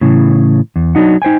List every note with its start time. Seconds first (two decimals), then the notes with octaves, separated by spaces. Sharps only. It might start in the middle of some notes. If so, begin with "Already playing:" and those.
0.01 A2 C#3 E3
0.76 E2
0.95 F#3 D4 D#4 F#5
1.22 D#4 C5 G5 G#5